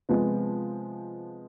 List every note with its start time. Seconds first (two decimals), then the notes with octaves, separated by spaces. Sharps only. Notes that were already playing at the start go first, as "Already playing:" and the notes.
0.09 C3 F3 G#3 B3